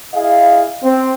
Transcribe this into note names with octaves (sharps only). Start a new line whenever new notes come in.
E4 G#4 D#5 F5
C4